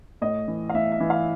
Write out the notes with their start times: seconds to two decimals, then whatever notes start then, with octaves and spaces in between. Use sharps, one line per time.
0.22 A2 D#5
0.48 E3
0.69 F5
0.74 A2 E5
0.92 E5
1.00 E3
1.10 F5